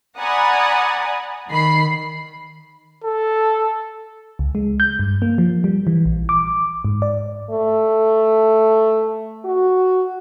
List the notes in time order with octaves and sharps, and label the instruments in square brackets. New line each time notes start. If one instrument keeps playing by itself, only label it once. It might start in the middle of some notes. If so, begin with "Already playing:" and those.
[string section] D5 F#5 G#5 A#5 B5 D#6
D#3 B5 C7
[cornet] A4
[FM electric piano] C#2
G#3
G6
G2
A#3
F3
G3
E3
A#1
D6
G#2
D5
[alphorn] A3
F#4